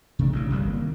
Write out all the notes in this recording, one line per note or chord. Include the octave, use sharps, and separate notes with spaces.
C3 E3 A3 D4
A1 D2 C#3
G1 C2 F2 G3
A#3
D#3